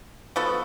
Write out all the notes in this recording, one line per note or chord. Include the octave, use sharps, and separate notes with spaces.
F3 B3 F#4 A4